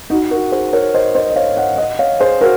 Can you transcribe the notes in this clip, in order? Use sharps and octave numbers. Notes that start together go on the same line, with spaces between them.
D#4 F#4
F#4 A#4
G#4 C5
A#4 C#5
C5 D#5
C5 D#5
D#5
C#5 F5
D#5 F#5
D#5 F#5
C#5 F5
G#4 C5
F#4 A#4